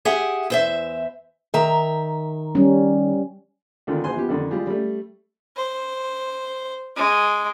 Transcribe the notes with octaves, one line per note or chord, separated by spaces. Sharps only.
G4 G#4 E5 F#5
E2 C5 E5
D#3 E5 A#5
G3 C#4
C#2 D3 D#3 F4
A#1 F#4 C5 G#5 C6
F3 B3 G4
F2 D3 D#3
G3 G#3 F4 G4 G#4
G3 A3
C5
G#3 D6